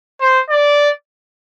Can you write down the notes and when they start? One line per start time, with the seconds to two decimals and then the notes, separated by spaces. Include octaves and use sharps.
0.21 C5
0.50 D5